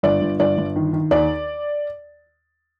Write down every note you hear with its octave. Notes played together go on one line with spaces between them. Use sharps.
G1 D5
G1
G1 D5
G1
D#3
D#3
D#2 D5